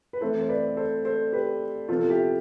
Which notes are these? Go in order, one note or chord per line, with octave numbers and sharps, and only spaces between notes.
B4
E3 A3 C4 A4 C5
C5
B4 D5
A4 C5
A4 C5
G4 B4
C3 F3 B3 F4 A4
A4
E4 G4